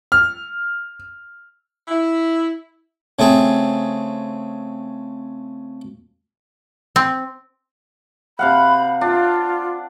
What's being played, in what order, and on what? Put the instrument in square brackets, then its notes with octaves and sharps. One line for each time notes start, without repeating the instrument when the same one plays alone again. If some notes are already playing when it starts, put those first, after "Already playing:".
[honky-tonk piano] F6
[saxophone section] E4
[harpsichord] C#3 A3 C4 G#4
[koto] C4
[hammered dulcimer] C3 F5 F#5 [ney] B5
[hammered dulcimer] D4 [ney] F4